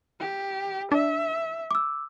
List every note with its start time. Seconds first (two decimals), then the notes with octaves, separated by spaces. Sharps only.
0.20 G4
0.92 D4 E5
1.71 D6 E6